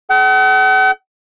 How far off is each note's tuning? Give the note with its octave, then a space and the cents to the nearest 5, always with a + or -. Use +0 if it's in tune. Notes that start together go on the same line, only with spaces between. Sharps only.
G#4 +40 F#5 +45